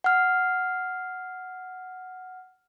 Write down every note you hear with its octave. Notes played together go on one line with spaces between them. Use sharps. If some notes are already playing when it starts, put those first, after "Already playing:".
F#5 F6